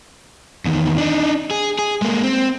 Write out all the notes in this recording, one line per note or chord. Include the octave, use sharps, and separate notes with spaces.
E2 D#3
D4 D#4
G#4
G#4
G#3 A#3
C4